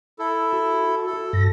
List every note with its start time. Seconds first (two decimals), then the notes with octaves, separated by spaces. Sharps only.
0.19 E4 A4
0.53 F#4
1.06 A4
1.33 G2 A#6